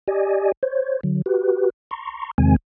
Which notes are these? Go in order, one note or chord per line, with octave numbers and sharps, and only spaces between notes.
G4 D5 D#5 G#5
C5 C#5
D3 F#3
F#4 G4 B4
A#5 C6 C#6
E2 C3 D#3 G#3 C4 G#5